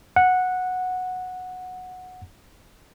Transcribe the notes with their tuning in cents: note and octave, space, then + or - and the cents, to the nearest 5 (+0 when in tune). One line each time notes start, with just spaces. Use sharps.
F#5 -10